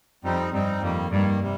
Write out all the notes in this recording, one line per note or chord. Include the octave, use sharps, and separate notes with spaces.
F2 G3 C4 D#4
G2 G3 C4 D#4
F2 D#3 G3 A#3
G2 D#3 G3 A#3
C3 G3